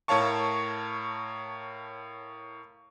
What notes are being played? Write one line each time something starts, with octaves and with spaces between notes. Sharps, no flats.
A2 A#4 C#5 F5 A5 C#6